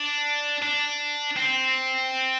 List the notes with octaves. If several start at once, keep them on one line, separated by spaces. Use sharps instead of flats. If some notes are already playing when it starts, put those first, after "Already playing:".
Already playing: D4
D4
C4